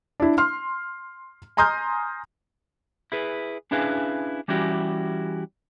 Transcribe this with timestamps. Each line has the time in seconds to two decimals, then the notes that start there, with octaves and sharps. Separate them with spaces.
0.20 D4 E4
0.38 C6 F6
1.57 G#5 A#5 C6 D#6 F6 G6
3.12 E4 G#4 B4
3.71 C#4 D4 E4 G#4 B4 F5
4.48 E3 G3 C#4 E4 F#4 G4